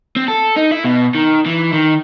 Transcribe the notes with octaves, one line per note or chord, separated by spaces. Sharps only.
C4
A4
D#4
E4
B2
D#3
E3
D#3